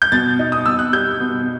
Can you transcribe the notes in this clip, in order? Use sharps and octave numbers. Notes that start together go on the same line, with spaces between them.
G6
B2 A6
D#4
D#6
B2 E6
F#6
G3 G6
B2